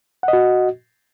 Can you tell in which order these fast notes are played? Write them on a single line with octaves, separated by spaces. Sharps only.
F#5 D#5 F#4